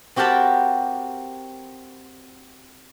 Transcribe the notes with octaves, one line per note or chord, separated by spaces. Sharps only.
C4 F#4 G4 A#4 A5 B5